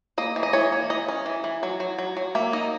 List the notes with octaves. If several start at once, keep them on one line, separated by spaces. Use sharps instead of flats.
A#3 D#5
E3
D#5
E3 C#5
A#3
E3 D#5
C#4
E3
E3
F#3
F#3
F#3
F#3
A#3 E5
D#4 D#5